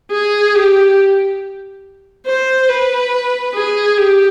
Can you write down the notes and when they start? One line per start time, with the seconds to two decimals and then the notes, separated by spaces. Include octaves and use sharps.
0.11 G#4
0.55 G4
2.26 C5
2.69 B4
3.54 G#4
3.98 G4